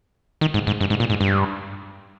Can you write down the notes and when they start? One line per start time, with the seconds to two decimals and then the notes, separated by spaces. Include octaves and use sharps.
0.41 D#3
0.54 G#2
0.67 G#2
0.81 G2
0.90 G#2
1.00 A#2
1.10 G#2
1.21 G2